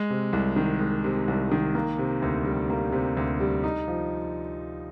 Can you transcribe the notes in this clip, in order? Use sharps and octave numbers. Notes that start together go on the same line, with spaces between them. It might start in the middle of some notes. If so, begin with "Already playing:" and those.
Already playing: G#3
C3
C2
D#3
G#3
C3
C2
D#3
A#3
C3
D2
G3
A#3
C3
D2
G3
D#4
F3